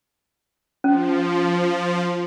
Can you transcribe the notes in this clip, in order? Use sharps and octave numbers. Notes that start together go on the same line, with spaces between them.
F3 C#4